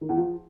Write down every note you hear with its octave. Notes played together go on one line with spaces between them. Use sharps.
D#3
E2
F3